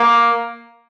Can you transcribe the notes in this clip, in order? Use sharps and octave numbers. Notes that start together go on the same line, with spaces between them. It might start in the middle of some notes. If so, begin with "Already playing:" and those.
Already playing: A#3